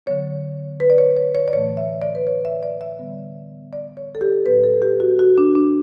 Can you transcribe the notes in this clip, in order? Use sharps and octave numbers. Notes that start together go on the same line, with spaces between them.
D3 F#3 B3 C#5
B4
D5
C#5
C#5
C#5
D5
A2 E3 A3 C#5
E5
D5
B4
C#5
E5
D5
E5
D3 G3 B3
D5
C#5
A4
G4
A2 F#3 B3 B4
A4
G4
F#4
F#4
D4
D4